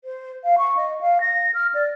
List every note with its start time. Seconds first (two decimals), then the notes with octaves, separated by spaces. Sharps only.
0.04 C5
0.44 F5
0.58 C#6
0.77 D#5
1.01 F5
1.21 A#6
1.54 F6
1.74 D5